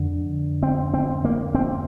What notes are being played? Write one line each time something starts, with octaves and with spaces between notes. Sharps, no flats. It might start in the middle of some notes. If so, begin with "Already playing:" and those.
Already playing: F2 D3
C4
C4
A#3
C4